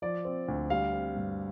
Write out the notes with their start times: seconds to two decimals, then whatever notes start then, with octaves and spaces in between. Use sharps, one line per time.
0.02 F3 D5
0.25 C4
0.48 D2
0.70 G3 F5
0.93 C4
1.17 G2